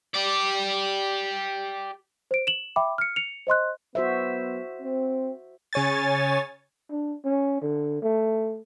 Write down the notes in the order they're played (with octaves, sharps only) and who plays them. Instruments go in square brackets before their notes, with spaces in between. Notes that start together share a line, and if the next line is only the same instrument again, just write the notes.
[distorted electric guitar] G4 D5
[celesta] C5 D7
E7 F#7
E5 G5 B5 D6
F6 C#7
C#7 F7
C5 D#5 C6 F#6
[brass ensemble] F#3 B3 [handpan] F#4 C5 E5
[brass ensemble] C4
[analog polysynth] C#3 C#5 G#5 A6
[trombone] D4
C#4
D3
A3